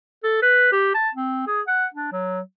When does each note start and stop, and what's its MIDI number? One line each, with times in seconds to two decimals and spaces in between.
0.23 0.42 69
0.42 0.72 71
0.72 0.93 67
0.94 1.09 81
1.15 1.42 60
1.47 1.61 68
1.67 1.85 78
1.94 2.11 62
2.12 2.40 54